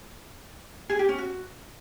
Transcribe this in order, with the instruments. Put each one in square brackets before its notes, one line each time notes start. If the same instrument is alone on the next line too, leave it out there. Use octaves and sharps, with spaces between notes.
[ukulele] G#4
G4
C#4
F#4